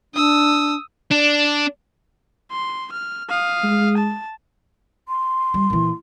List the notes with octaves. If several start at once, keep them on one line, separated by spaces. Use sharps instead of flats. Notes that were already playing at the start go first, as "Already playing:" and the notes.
D4 D#6 E6
D4
C6
F6
F5 D#6
G#3
A5
C6
G3
A#2 E3